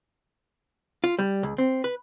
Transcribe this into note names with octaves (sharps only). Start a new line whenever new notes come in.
F4
G3
C#2
C4
B4